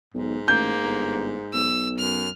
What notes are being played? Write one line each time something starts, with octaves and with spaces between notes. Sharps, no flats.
B1 G#2
A1 A#3 G6
G1
B1 E6
F#2 F6